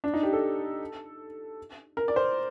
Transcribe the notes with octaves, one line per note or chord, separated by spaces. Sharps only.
D4
D#4
G4
A4
A#4
D5
C5